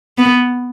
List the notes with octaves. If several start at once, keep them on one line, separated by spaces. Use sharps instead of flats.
B3